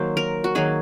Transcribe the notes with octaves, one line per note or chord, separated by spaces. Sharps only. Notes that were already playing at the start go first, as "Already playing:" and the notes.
Already playing: D#3 F#3 A#3 C5
A#4
F#4
D#3 F#3 A#3 G#4